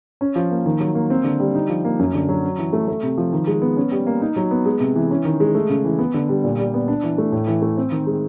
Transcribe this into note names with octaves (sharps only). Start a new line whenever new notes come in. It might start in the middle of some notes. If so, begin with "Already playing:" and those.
C#4
F3
A#3
D#3
F#3
A#3
C4
D3
G3
D#4
F3
A#3
F#2
D3
F#3
C#4
E3
A3
A3
C3
F3
D#3
G#3
B3
C#4
G3
A#3
D#4
F#3
B3
G#3
C3
E3
C#4
D#3
G#3
A3
C#3
E3
B3
D3
G3
A#2
G3
B3
D4
E3
A3
A2
E3
A3
C4
D#3
G#3